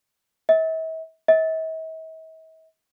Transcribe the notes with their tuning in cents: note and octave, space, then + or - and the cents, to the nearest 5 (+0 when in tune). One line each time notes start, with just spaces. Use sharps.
E5 -40
E5 -45